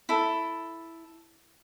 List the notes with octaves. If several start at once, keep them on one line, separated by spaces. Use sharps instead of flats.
E4 A4